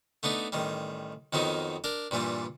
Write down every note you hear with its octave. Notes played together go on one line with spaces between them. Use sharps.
A3 B3 D4 D#4
A1 D#3 G3
F2 D#3 F#3 B3 D#4
D4 A#4
G2 A#2 E3 G3